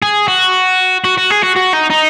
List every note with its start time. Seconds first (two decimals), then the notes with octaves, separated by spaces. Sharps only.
0.02 G#4
0.28 F#4
1.04 F#4
1.18 F#4
1.30 G#4
1.43 F#4
1.56 F#4
1.73 D#4
1.90 D#4